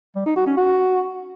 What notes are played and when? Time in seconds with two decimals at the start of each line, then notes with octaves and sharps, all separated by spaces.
0.16 G3
0.26 D#4
0.36 F#4
0.47 C#4
0.57 F#4